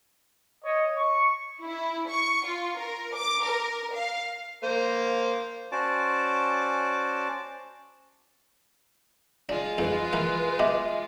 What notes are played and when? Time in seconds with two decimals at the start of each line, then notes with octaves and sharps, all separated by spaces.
0.64 C#5 D#5
0.97 C#6
1.62 E4
2.09 C#6
2.45 F4
2.77 A#4
3.15 D6
3.44 A#4
3.93 F5
4.64 A#3 C5 F5
5.72 C#4 F#4 C5 D5 A5 D6
9.49 G#3 D4 F4
9.78 F2 G#2 B4
10.13 E3 A#3
10.59 B2 D#5 E5 D6